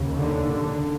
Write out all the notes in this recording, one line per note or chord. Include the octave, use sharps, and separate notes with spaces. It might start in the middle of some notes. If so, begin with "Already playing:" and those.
Already playing: D#2 C#3
D3
D3